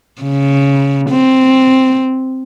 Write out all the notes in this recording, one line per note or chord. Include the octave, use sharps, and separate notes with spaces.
C#3
C4